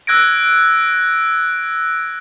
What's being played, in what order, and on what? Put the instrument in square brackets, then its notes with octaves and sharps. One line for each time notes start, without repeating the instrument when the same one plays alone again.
[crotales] E6 F#6 G#6 A#6 D7